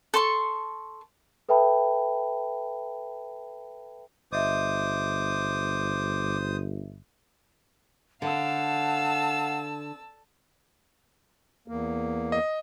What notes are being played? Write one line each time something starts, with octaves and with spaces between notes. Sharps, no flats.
A4 C6 C#6
A4 B4 E5 G5 A5 B5
G1 C5 D#5 E5 D6 D#6
D3 F5 F#5 A5 E6
E2 A#3
D#5